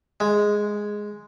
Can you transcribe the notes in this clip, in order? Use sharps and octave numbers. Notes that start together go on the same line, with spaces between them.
G#3